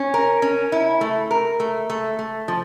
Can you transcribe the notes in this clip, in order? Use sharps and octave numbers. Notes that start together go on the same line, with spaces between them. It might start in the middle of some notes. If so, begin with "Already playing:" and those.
Already playing: C#4
A#4
C#4
E4
A3
A#4
A3
A3
A3
F3